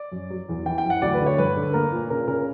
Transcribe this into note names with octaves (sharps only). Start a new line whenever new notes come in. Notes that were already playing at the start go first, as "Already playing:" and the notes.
Already playing: D5
F#2
F#3
E2
E3 G5
G5
F#2
F#5
D2 D5
B4
D3
C#5
G2 B4
D3
A#3 A#4
A#2
C#3 A#4
C#3 A#4